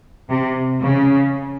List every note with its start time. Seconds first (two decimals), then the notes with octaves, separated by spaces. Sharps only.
0.29 C3
0.83 C#3